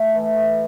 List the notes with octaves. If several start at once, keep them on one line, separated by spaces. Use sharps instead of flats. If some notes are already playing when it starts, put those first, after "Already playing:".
Already playing: A2 A3
E3
A2